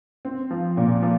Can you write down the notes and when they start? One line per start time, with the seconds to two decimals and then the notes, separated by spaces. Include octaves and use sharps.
0.25 C4
0.51 F3
0.77 A#2
1.02 F3